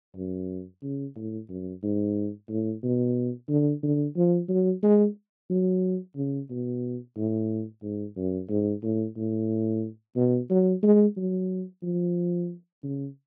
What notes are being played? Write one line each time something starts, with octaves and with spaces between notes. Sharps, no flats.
F#2
C#3
A2
F#2
G#2
A2
B2
D3
D3
F3
F#3
G#3
F#3
C#3
B2
A2
G#2
F#2
G#2
A2
A2
B2
F#3
G#3
F#3
F3
C#3